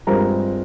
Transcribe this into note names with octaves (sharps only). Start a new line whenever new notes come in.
G2 F3 G#3 C4 A#4 A#5